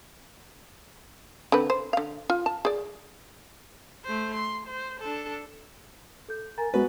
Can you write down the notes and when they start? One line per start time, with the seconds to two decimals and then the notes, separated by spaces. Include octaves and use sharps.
1.52 D3 C4 B4
1.70 C5
1.93 D3 F5
2.30 F4
2.46 A5
2.65 G#4 D5
4.04 A3 C5
4.34 C6
4.67 C5
5.00 D4 A4
6.29 A4 G6
6.58 A#4 G#5 A#5 A6
6.74 G#3 B3 F#4 B4